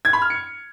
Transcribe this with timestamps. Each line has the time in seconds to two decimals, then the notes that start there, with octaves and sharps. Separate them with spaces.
0.05 G#6
0.13 B5
0.22 F6
0.30 C#7